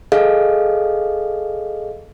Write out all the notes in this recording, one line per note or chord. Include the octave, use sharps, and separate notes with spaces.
G#4 A4 D#5 F5